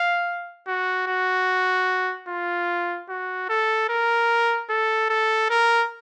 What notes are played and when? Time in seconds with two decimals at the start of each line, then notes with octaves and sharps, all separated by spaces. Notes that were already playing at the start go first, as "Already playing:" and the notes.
Already playing: F5
0.68 F#4
1.08 F#4
2.29 F4
3.09 F#4
3.49 A4
3.90 A#4
4.70 A4
5.10 A4
5.50 A#4